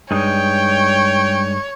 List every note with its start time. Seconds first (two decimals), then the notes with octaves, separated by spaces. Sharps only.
0.11 G2 G#3 D#4 C#5 G5